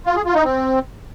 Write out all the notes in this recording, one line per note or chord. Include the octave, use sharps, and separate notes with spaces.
F4
G#4
F4
D#4
C4